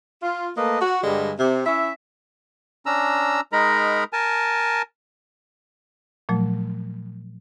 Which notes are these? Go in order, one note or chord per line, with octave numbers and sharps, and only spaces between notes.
F4
A3 A#3 B4 D#5
F#4
G2 D3 G3 G#3
C3
C#4 E4 E5
C#4 D4 A#5 E6
G#3 D#4 A#4 A#5 B5
A#4 G#5 A5
A#2 F3 F#3 A3